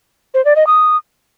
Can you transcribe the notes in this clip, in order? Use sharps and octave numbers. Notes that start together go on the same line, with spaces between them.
C5
D5
D#5
D#6